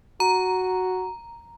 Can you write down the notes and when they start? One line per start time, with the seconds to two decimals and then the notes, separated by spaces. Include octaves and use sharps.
0.20 F#4 A#5